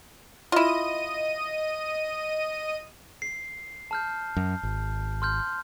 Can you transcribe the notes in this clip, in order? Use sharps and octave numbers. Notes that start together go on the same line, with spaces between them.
E4 F4 D#5 D#7
C7
A5 F6 G6
F#2
G#1
C6 F6 G6